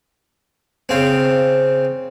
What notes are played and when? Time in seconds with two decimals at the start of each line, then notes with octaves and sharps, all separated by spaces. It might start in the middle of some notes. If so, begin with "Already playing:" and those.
0.89 C#3 C4